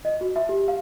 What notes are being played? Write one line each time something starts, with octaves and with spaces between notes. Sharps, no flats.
D#5
F#4
E5
G4
F5